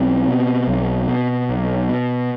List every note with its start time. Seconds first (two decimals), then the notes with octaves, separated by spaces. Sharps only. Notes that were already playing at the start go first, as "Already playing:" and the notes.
Already playing: B1 C4
0.27 B2
0.68 B1
1.08 B2
1.49 B1
1.89 B2